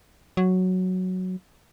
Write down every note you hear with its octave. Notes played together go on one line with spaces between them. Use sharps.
F#3